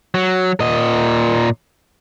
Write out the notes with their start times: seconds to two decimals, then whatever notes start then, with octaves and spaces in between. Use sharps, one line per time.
0.14 F#3
0.60 A#2 D#5